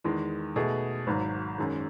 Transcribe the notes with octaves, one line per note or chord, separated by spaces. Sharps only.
E2 D#3 G#3
B2 A3 D#4 G#4
G#1 G#2 F#3
F#2 D#3 G#3